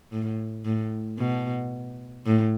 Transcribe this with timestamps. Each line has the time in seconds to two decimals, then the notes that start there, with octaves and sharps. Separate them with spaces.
0.12 A2
0.65 A2
1.18 B2
2.26 A2